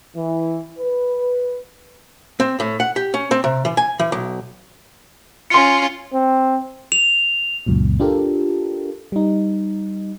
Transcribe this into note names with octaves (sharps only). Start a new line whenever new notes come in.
E3
B4
C4
A2
F#5
G4
C#4
C4
C3
E3
G#5
E3
B1
C#4 F4 C6 C#7
C4
F7
C#2 F#2 A#2
D4 F4 G4 A4 A#4
G3 D#4